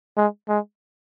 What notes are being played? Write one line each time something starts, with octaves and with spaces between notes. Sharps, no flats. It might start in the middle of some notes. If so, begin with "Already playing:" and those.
G#3
G#3